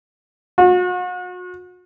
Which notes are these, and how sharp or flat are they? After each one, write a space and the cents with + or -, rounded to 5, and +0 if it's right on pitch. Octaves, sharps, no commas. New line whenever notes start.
F#4 -40